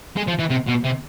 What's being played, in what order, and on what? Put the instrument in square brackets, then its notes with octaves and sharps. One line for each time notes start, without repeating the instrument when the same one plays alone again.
[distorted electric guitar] G#3
F3
E3
C3
B2
C3